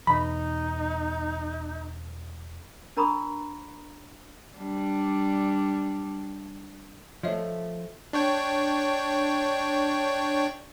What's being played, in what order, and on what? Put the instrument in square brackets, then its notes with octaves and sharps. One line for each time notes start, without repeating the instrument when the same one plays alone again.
[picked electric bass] E2 B2 E3 [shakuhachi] D#4 [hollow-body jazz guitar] B5
[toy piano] D4 A#4 A#5 B5 C#6 D#6
[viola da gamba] G3 D4
[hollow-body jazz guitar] F3 A3 [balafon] C#5 D#5 E5
[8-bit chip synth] D4 C#5 G5